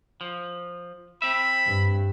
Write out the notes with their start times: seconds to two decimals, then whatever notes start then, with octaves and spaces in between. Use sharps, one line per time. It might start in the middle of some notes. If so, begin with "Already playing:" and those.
0.21 F3
1.22 C4 E5 B5
1.67 G2